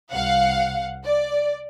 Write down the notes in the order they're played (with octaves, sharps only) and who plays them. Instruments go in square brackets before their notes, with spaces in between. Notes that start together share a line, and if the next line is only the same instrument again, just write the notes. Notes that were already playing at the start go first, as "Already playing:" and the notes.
[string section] C2 F5 F#5
D5